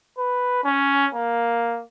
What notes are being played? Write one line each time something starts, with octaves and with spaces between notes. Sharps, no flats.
B4
C#4
A#3